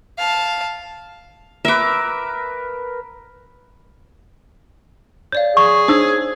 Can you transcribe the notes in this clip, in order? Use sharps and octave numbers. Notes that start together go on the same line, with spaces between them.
F5 A5
A#4 B4 E5 D6
C#5 D5 F5 G6
G#4 C#6
D4 D#4 C5 C#5 E6 G#6